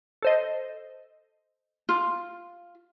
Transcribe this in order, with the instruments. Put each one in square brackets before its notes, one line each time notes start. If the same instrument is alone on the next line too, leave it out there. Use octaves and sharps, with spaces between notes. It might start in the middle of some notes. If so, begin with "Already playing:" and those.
[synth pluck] A4 C5 D#5
[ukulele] F4